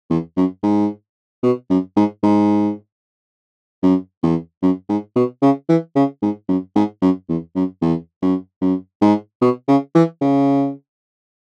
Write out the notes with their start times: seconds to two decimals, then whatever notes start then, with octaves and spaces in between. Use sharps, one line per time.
0.10 E2
0.37 F#2
0.63 G#2
1.43 B2
1.70 F#2
1.96 G#2
2.23 G#2
3.83 F#2
4.23 E2
4.63 F#2
4.89 G#2
5.16 B2
5.42 C#3
5.69 E3
5.96 C#3
6.22 G#2
6.49 F#2
6.76 G#2
7.02 F#2
7.29 E2
7.56 F#2
7.82 E2
8.22 F#2
8.62 F#2
9.02 G#2
9.42 B2
9.68 C#3
9.95 E3
10.21 C#3